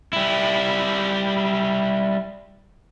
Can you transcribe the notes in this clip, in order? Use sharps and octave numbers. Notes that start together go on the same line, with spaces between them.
G3 E4